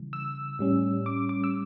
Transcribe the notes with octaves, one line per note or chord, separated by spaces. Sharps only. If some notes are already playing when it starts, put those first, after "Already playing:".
Already playing: C#3 E3 G3
E6
A2 G3 C#4
D6
D6
E6